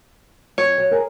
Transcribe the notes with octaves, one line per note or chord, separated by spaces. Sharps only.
F2 C#5
F#3
G#4 A#4